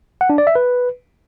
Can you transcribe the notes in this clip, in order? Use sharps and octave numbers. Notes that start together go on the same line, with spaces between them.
F#5
D4
D5
E5
B4